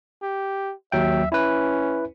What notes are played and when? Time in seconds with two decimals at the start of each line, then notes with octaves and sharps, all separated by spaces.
0.22 G4
0.92 D#2 F#3 E5 G5
1.32 C#4 E4 B4